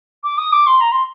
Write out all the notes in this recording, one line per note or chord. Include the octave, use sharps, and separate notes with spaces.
D6
D#6
D6
C6
A#5
C6